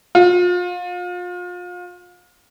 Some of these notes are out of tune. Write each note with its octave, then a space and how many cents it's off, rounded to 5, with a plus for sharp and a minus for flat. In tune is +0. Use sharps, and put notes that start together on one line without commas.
F4 +35